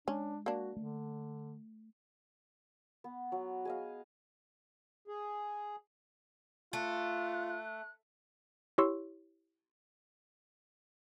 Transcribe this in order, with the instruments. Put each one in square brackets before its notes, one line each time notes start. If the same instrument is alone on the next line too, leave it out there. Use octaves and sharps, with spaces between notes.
[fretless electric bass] G#3 [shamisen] C#4 [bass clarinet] D4
[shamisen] A#3 D4 [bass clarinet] F#4
[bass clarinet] D3 [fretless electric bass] A3
[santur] B3
F#3
G#4 D#5 F5
[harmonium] G#4
[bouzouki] A3 [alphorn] F4 [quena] F#6
[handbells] E4 G4 C#5 C6 C#6 E6